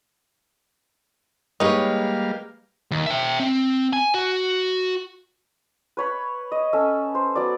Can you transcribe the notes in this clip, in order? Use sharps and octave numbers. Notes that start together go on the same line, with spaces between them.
G3 G#3 A#3 D#4 G4 B4 C#5 F5
D#2
E5 G5
C4
G#5
F#4
B4 C#5 B5
D#5
C#4 A4 E5
C5
F#3 B3 D5